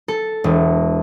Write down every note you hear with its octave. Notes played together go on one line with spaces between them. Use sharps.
A4
E1